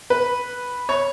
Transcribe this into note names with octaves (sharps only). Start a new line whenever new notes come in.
B4
C#5